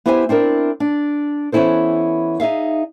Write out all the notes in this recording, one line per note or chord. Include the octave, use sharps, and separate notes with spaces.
B3 E4 G4 C5 G5 G#5
C4 D4 E4 A#4
D4
E3 B3 C#4 E4 A4 C5
D#4 G#4 E5 F5